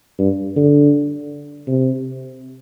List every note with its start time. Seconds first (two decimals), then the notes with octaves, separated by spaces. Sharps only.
0.19 G2
0.56 D3
1.67 C3